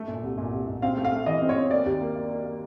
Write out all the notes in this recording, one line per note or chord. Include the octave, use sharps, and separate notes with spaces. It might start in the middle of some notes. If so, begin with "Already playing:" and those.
Already playing: A3
A#2
C2
A#2
C2
A#2
C4 F5
A3
F5
A3
E3 D#5
C4
C#5
C4
A#3 D5
D#2
A#3
A#3
A#3
A#3